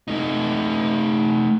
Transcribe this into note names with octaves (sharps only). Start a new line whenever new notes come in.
A3 D#4